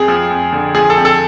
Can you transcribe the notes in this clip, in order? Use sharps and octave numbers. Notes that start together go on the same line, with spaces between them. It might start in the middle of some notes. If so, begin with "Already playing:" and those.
Already playing: F2 G#4
F3
F2
D3
F3 G#4
A4
F2
A4